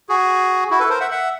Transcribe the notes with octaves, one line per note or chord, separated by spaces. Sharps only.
F#4 G#4
E4 F#4
A4 B4
A#4 C5
E5 F#5
E5 F#5